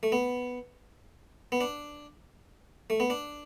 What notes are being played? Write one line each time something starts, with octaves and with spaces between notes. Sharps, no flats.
A3
B3
B3
D4
A3
B3
D4